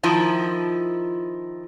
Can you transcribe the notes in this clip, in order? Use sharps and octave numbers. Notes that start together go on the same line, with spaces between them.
D#3 F3 E4